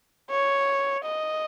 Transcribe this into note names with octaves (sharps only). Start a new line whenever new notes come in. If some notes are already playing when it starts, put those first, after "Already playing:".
C#5
D#5